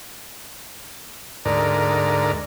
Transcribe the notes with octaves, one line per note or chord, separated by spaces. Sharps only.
D2 G#2 A#4 D5